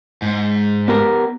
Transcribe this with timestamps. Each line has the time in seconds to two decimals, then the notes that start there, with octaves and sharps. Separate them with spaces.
0.22 G#2
0.88 B3 G4 A#4